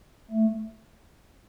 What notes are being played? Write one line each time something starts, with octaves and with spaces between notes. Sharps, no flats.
A3